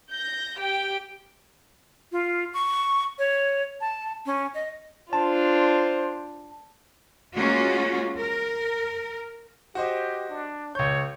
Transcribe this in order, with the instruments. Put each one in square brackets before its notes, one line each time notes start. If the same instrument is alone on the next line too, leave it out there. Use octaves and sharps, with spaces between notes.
[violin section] G6 A#6
G4 G5
[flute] F4
C#6
C#5
A5
C#4
D#5
[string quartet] D4 F4 [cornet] C5 [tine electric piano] A5
[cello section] G#3 A#3 C#4 F4 F#4
A#4
[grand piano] F#4 C5 D#5 [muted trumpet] G4
[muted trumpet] D4
[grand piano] C#2 G6 [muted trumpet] C#5